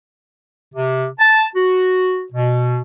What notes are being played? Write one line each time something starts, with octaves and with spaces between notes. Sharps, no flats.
C3
A5
F#4
B2